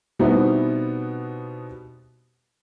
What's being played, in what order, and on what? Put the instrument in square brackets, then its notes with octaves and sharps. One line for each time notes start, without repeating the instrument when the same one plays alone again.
[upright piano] B2 G3 B3 C4 D#4 E4